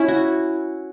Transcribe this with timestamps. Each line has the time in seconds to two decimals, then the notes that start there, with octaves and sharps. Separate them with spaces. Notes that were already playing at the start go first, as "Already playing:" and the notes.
Already playing: C#4 E4
0.08 F#4